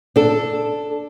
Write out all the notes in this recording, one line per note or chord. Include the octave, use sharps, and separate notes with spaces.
D4 A4